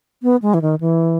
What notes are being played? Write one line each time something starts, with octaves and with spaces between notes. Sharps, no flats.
B3
G#3
E3
D#3
E3